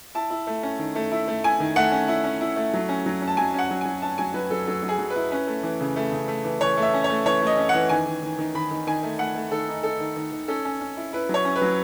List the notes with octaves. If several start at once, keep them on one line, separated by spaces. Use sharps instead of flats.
E4 A5
E4
A3
C#4
D#3
A3
E4
A3
E4 G#5
D#3
A3 F#5
C#4
E4
C#4
E4
A3
F#3
C#4
F#3
C#4
A5
F#3 G#5
C#4 F#5
F#3
G#5
F#3
C#4 A5
F#3 G#5
F#3 B4
F#3 A4
F#3 A4
F#3
G#4
F#3
B4
E4
C#4 B4
A3
E3
C#3
A3
C#3
A3
E3
E3 C#5
A3
E5
C#4
C#5
A3
E3 C#5
A3
D#5
C#4
F#5
E3
D#3 G#5
D#3
D#3
D#3
D#3 B5
D#3
D#3 G#5
A3
A3 F#5
A3
D#3 A4
D#4
D#4 A4
D#3
D#3
D#3
C#4 A4
C#4
C#4
E4
E4 B4
F#3
C#5
C#4
B4
F#3